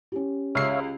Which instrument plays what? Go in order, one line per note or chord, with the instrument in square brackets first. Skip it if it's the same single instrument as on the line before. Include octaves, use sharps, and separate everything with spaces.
[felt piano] C#4 G4
[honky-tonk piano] C#2 C7 [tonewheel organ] C#5 E5 F5